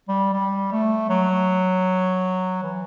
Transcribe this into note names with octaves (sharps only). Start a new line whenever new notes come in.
G3
G3
A3
F#3
E3